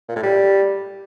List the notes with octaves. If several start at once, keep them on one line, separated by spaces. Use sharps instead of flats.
A#2
A2
G3